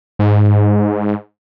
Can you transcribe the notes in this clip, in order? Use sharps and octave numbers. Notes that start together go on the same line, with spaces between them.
G#2